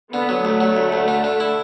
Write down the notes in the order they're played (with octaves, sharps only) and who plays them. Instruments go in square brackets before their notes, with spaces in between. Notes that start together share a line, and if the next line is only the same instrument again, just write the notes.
[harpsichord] D3 [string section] B3
[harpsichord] F#3
[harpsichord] D2 [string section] A3
[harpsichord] F#3
D2
D2
D3
D3
E4